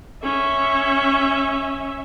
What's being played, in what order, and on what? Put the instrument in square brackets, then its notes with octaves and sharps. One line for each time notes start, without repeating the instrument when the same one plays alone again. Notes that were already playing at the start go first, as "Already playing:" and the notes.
[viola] C#4 E5